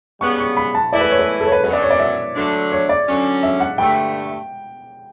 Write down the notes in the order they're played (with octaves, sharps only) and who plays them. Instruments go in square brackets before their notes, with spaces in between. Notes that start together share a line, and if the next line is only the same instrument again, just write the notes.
[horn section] C#3 G3 B3 [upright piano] C#6
[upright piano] C#6
B5
A5
[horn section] E3 A3 E4 [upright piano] D5
[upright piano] B4
C#5
B4
A4
C#5
B4
[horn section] F#2 D3 F#3 [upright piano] B4
[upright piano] D5
C#5
D5
E5
[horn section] D3 F#3 A3 D4
[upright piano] C#5
D5
[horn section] D3 F#3 C#4
[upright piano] E5
F#5
[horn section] G2 D3 A3 [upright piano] G5